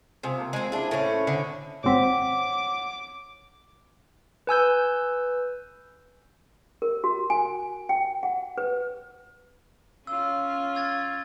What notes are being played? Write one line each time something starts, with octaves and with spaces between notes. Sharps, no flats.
C3 C4 F4 G#4
A#3 A4
G#3 C4
D4 E4 G#4
A2 C#4
D3 D#5 G#5
G#1 C4 C#5 F#5 D6 B6
B4 G#5 E6 G6
A#4
F#4
G#5
G5
F#5
B4
C#4 F4 E6
E6 G#6 A6